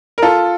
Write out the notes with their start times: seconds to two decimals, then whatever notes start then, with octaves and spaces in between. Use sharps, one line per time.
0.18 A#4
0.22 F4 A4